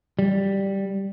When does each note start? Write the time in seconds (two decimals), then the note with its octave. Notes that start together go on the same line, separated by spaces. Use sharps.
0.19 G3